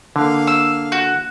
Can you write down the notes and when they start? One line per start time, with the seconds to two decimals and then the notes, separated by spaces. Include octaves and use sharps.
0.16 D3 A#3 F5
0.47 E6
0.92 F#4